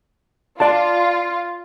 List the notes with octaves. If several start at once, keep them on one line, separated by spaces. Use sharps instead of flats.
F4 D5 A5